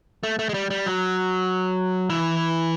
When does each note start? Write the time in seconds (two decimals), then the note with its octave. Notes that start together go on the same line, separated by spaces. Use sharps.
0.23 A3
0.39 A3
0.49 G#3
0.54 G3
0.70 G3
0.86 F#3
2.10 E3